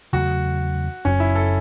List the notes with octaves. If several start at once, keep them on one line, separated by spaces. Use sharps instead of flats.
E2 C#3 F#3 A3 F#4
F#1 F#2 F#3 C#4
E4
A4